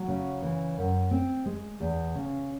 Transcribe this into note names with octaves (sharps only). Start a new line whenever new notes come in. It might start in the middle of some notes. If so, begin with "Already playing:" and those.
Already playing: F#3
C#3
E3
F#2
C4
G#3
E2
C#3